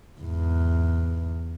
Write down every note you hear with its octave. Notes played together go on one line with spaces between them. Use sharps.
E2 G#2